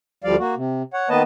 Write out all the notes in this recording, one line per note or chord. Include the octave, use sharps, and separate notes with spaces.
D2 F3 G3 D5 F5
A#3 F#4
C3
C#5 F#5
D#3 A#3 B3 B4 D#5 A5